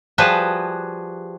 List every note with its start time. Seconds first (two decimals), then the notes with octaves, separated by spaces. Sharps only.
0.18 F3 G3 F#4 G#4 B4 A5